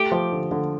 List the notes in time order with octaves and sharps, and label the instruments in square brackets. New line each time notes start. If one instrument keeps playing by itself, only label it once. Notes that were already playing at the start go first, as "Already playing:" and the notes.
Already playing: [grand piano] A3 [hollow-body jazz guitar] G4
[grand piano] F3
D3
D3